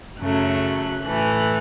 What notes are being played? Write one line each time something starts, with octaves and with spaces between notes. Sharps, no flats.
F#2 C#3 F#3 A3 F#6
A2 E3 A3